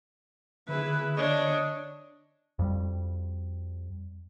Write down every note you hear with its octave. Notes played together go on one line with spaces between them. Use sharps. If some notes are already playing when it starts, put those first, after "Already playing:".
D3 E4 G#4 B4
D4 C#5 D#5
F2 G3